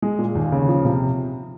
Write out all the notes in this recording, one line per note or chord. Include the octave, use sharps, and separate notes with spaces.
G#3
A#2
D#2
C#3
F3
C3